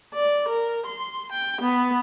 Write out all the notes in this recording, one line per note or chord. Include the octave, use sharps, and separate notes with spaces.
D5
A#4
C6
G5
B3